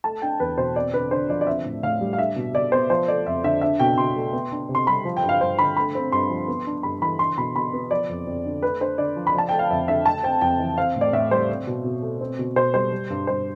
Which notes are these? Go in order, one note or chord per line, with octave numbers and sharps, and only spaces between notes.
A3 A5
D4 G5
E2 B4
B2 C5
C4 D5
D3 B4
D3 C5
F3 D5
D5
C4 E5
A2
A2 F5
G3
F5
D4 E5
B2
B2 D5
B3 C5
F3 C5
A3 D5
F2 E5
D3 E5
D4 E5
B2 G5
B2 C6
A3
B3
D4
C3
C6
G3 B5
F3
G5
G2
F5
G2 C5
D3 B5
A3 B5
C4
G2 C6
F3
B3
D4
G2 B5
E3 B5
D4 C6
B2 B5
B2 B5
B3
F3 D5
F2
F2
D3
A3 B4
D4 C5
D3 D5
F3
B5
F3 A5
A3 G5
F5
F2 E5
D3 E5
A3 A5
C4 G5
F2 G5
E3
C4 F5
A2
D5
A2 E5
G3 C5
C4
B2
B2
A3
C4
B2
B2 C5
G3 C5
G3
G2
G2 C5